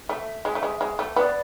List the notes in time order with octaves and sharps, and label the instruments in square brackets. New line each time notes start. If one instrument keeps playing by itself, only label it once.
[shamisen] A3 [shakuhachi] E5
[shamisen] G#3
A3
G#3
G#3
A3
[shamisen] B3 [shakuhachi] D5